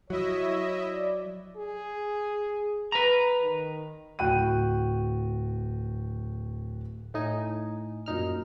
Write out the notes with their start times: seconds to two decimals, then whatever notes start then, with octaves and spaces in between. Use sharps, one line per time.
0.10 F#3 E4 C#5 D#5 E5
0.93 D5
1.57 G#4
2.92 B4 A#5
3.41 D#3
4.19 D1 F#4 G5 F#6 D#7
7.14 A2 D#4 G#5
8.06 F#2 A#2 D#4 F6